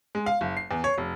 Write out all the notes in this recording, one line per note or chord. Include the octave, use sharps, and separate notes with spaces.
G#3
F5
F#1
C7
E2
C#5
F1